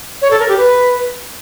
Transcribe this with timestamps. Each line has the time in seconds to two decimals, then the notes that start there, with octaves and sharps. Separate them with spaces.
0.22 C#5
0.30 A4
0.39 A#4
0.48 G4
0.57 B4